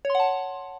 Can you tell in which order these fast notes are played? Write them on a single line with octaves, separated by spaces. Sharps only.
C#5 C6 F#5 A5